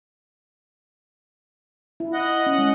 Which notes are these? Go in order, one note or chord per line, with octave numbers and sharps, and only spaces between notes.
E4
D#5 F#5
C#4
G#3